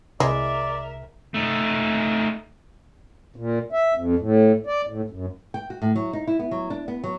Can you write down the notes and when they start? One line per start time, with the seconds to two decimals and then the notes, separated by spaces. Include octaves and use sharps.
0.20 C2 G#3 E4 A#4 D5 E5
1.34 A3 D#4
3.36 A#2
3.72 E5
3.94 F2
4.19 A2
4.66 D5
4.87 A2
5.10 F#2
5.54 G5
5.70 F#4
5.82 A2
5.96 F#3
6.13 D#4
6.27 E4
6.39 B3
6.51 F#3
6.70 D4
6.88 B3
7.04 F#3